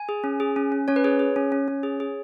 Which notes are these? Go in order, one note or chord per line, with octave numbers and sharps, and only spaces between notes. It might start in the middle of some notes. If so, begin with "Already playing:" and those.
Already playing: G#5
G#4
C#4
G#4
C#4
C#4
C#4 C#5
B4
G#4 C#5
G#4
C#4
C#4
C#4
G#4
G#4